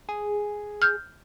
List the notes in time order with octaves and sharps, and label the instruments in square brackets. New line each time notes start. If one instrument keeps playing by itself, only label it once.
[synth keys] G#4
[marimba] F6 G6